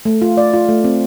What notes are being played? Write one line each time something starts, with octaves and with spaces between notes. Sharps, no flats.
A3
F4
D5
F4
A3
C4